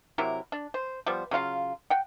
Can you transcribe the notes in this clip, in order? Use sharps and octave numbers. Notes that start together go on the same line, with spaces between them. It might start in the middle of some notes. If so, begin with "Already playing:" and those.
C3 F#3 E4 A#4
D4
C5
F3 G3 B3 C5
C#3 F#3 F4 F5
F#5 G5